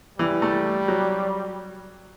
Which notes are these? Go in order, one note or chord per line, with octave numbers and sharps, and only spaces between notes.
E3 G3
A3
F#3